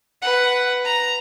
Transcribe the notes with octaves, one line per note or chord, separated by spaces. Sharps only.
B4 F#5
A#5